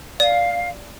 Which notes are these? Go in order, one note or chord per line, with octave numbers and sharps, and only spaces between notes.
D5 F5